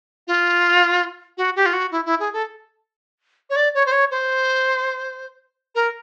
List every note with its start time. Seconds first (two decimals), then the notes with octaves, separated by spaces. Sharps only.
0.27 F4
1.37 F#4
1.56 G4
1.66 F4
1.73 F#4
1.91 E4
2.05 E4
2.20 G#4
2.33 A4
3.50 C#5
3.56 D5
3.74 C#5
3.86 C5
3.92 C#5
4.11 C5
5.75 A#4